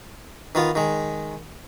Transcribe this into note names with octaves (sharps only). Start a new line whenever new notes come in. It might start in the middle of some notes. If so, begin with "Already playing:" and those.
D#3 B3 F4
D#3 G#3